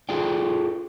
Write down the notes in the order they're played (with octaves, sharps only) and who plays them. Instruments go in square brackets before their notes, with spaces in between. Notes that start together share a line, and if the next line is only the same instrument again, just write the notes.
[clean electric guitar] F4 G#4 A4 D5 G5